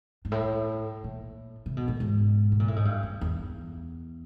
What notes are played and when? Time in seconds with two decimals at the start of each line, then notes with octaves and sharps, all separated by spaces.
0.25 G#2
0.32 A2
1.04 A#2
1.66 C3
1.77 B2
1.88 A2
2.00 G#2
2.52 B2
2.60 A#2
2.68 A2
2.76 G#2
2.85 G2
3.03 F2
3.21 E2